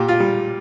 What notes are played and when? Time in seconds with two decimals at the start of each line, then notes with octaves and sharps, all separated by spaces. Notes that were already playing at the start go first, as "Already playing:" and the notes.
Already playing: A#2 G4
0.08 F4
0.20 G3